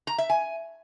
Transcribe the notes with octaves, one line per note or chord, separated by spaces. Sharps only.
A#5
E5
G#5